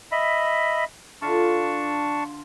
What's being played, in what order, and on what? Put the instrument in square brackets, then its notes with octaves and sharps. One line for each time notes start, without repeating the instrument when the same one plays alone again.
[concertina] D#5 E5 B5
[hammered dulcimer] D3 F4 [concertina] D4 A5 C#6